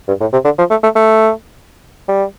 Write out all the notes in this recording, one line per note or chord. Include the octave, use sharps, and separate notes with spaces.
G2
A2
C3
D3
F3
A3
A3
A3
G3